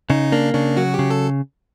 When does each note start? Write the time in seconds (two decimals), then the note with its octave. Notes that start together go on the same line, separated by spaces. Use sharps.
0.10 C#3 D#4
0.32 A#3 D4
0.54 C#3 D4
0.77 F#3 F#4
0.94 G4
0.99 C#3
1.11 A4